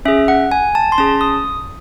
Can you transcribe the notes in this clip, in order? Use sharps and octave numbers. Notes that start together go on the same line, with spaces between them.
C#4 G#4 E5
F#5
G#5
A5
C6
C#4 G#4 A5
D#6